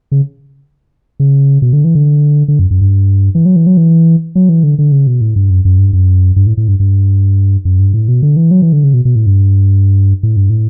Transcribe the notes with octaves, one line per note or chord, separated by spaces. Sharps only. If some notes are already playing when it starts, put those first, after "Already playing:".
C#3
C#3
B2
D3
E3
D3
D3
F#2
F#2
G2
E3
F#3
E3
F#3
E3
F#3
E3
D3
D3
C#3
B2
A2
G2
F#2
F#2
G2
F#2
G2
A2
A2
G2
G2
F#2
G2
A2
B2
D3
E3
F#3
E3
D3
C#3
B2
B2
A2
G2
A2
G2
A2